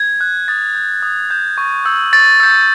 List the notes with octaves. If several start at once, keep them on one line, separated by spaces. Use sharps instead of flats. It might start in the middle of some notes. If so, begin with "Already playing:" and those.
Already playing: G#6
F#6
D#6 A6
G6
D#6
G6
C#6
E6 G6
C#6 A6
E6 G6